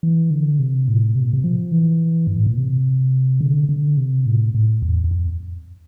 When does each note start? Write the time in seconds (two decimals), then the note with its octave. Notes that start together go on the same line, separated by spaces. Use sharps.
0.03 E3
0.31 D3
0.59 C3
0.88 A2
1.15 C3
1.24 A#2
1.33 C3
1.44 F3
1.72 E3
2.27 G2
2.37 A2
2.46 A#2
2.57 C3
3.41 D3
3.69 D3
3.97 C3
4.26 A2
4.55 A2
4.82 E2
5.04 E2
5.11 F2